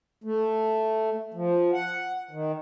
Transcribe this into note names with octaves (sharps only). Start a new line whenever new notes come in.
A3
F3
F#5
D#3